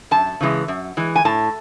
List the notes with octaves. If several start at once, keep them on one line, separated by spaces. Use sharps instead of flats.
F#2 A5
C#3 E3 G#3
F#2
E3 G#3
G#5
A2 A5